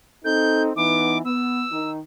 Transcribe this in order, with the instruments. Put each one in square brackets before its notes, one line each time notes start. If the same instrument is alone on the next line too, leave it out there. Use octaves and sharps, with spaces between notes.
[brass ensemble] C4 D#4 A4 [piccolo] G6
[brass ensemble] E3 B3 D#4 [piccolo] D6
[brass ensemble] B3 [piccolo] E6
[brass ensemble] D#3 D#4